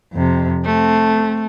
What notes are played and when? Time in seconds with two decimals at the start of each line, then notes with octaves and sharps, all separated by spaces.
0.13 F2 C3
0.65 A3 C4